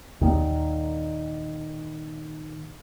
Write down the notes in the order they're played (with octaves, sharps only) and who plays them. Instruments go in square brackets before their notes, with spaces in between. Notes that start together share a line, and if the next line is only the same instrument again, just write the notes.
[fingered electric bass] D#2 A#3 [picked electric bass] A#2 D#3